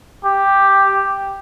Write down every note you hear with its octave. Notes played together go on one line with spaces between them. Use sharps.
G4